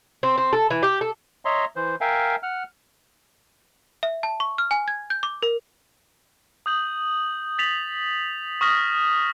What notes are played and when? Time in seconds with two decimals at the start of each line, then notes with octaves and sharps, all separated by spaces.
0.23 C4
0.38 C4
0.53 A4
0.70 E3
0.83 G4
1.01 A4
1.45 C#5 D#5 E5 A#5 C6
1.76 E3 C5
2.01 A#4 E5 F5 G5 G#5
2.43 F#5 F6
4.03 E5
4.23 A5
4.40 C#6
4.58 F6
4.71 G#5
4.88 G#6
5.10 G6
5.23 D6
5.42 A#4
6.66 D#6 G6 F#7
7.58 A6 B6 F7 F#7
8.61 C#6 D#6 F6 A#6 B6